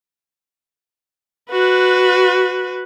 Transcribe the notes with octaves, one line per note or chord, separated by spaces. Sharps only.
F#4 B4